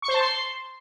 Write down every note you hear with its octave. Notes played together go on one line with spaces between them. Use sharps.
C#6
C5
A5
C6